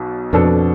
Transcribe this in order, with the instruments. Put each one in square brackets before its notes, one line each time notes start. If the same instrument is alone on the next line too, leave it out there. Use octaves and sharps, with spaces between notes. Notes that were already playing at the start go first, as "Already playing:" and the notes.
Already playing: [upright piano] B1 B2
[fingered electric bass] F2 [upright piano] B2 B3 D4 A4